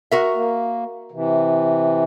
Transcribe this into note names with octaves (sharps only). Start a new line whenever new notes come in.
F#4 A#4 E5
A#3
C3 E3